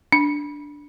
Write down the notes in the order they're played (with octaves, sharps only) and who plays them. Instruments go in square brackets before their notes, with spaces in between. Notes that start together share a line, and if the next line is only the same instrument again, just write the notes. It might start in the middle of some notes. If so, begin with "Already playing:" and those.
[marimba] D4